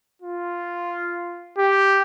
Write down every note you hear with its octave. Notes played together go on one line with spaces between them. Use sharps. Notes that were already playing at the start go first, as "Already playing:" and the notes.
F4
G4